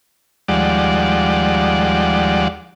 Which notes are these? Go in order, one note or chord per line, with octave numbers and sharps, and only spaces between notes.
D#2 F3 G3 G#3 D5 F#5